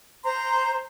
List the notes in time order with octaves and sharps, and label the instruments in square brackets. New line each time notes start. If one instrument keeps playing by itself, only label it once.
[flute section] C5 A#5 C6